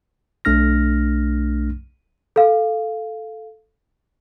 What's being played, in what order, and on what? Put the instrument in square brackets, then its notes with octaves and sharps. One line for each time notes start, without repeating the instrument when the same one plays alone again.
[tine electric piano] B1 A3 D4 F6 A#6
[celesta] A4 F5